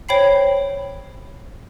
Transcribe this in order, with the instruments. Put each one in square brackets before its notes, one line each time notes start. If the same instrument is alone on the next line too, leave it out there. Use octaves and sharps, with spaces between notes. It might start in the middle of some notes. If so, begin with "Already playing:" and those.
[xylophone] C5 C#5 G5 B5 C7